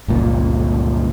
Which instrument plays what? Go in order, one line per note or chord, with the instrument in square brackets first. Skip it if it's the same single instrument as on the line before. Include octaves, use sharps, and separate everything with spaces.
[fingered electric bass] G1 C#2 A#2